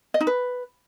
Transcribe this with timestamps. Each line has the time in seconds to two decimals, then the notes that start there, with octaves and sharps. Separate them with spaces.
0.14 D#5
0.21 D#4
0.27 B4